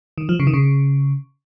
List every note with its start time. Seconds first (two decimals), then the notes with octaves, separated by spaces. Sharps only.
0.18 D#3
0.29 F3
0.40 C#3
0.47 D#3
0.54 C#3